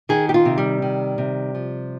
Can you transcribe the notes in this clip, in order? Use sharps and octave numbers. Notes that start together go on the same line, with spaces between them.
D#3 G#4
G4
F4
C3
G3
D#3
C3
F3